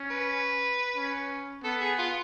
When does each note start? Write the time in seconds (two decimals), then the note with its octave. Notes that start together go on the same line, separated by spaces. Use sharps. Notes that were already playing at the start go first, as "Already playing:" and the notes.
Already playing: C#4
0.10 B4
0.96 C#4
1.64 B3 A4
1.81 G#4
1.99 F4